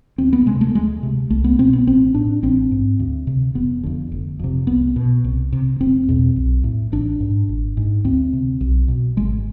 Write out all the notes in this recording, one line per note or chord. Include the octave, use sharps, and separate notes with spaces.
D2 C4
B3
C3 G#3
A3
D2 G#3
C3
C2 A3
B3
B2 C4
B3
A1 C4
A2 D4
A1 C4
G#2
D2
C3
F1 B3
F2 D3
F1
F2 C3
C2 B3
B2
C2
C3
F1 C4
E2 B2
B1
A2
A1 D4
G#2
G#1
G#2
D2 C4
C3
B1
B2
G#1 G#3